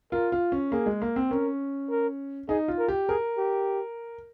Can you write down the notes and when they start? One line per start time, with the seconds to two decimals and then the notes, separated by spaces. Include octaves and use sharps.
0.12 F4 A#4
0.32 F4
0.52 C#4
0.72 A#3 G#4
0.86 G#3
1.02 A#3
1.16 C4
1.31 C#4 A#4
1.90 A#4
2.49 D#4 G#4
2.68 F4
2.78 A#4
2.88 G4
3.08 G#4 A#4
3.37 G4